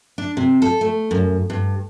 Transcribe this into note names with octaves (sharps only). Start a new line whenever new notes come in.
D4
C3
A4
A3
F#2
G2